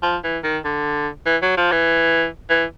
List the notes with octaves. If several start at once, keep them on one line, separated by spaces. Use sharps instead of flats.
F3
E3
D#3
D3
E3
F#3
F3
E3
E3